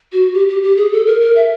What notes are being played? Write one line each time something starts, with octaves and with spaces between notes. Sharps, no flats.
F#4
G4
G4
G4
G#4
A4
A#4
A#4
E5